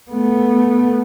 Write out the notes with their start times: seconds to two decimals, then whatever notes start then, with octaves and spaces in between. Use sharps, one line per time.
0.11 A3 B3